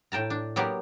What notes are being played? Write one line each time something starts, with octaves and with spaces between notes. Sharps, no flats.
A2 G5 A5 A#5
D4
F#3 A#3 B3 G4